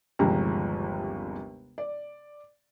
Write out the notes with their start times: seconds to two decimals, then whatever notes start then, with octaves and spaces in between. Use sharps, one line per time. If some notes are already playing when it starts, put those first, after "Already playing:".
0.19 G1 D#2 C3 F3 G#3 A#5
1.78 D5